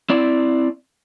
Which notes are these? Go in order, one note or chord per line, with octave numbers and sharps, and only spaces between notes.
C4 E4 D5